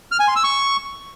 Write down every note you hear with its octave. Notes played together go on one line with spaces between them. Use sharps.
F6
G#5
C6
E6
C#6